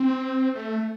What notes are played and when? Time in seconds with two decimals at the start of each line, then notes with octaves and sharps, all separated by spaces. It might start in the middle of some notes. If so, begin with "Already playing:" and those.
Already playing: C4
0.55 A3